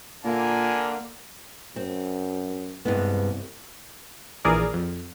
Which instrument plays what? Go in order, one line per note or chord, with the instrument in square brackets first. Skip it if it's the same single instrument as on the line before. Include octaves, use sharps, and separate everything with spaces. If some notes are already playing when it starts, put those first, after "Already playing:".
[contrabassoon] A#2 [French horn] D3 [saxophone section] A#3 [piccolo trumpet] G#5
[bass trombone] F#2 [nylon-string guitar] C4
[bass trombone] C2 [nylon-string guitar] G2 G#3 B3
[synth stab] A#1 E3 G#4 A#4 D5
F2